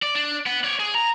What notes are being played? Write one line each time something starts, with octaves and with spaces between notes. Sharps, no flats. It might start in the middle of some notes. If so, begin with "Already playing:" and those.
D5
D4
B3
C#5 D5
G#4
A#5